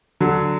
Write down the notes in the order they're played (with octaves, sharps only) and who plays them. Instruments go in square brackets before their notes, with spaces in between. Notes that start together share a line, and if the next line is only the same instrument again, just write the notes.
[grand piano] D3 F#3